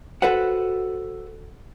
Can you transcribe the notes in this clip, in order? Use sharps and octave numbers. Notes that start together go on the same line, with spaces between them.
F#4 A4 B4 C5 F#5